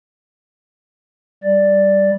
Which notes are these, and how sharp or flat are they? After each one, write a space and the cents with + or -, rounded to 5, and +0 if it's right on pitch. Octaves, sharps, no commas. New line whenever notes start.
G3 +0 D5 +0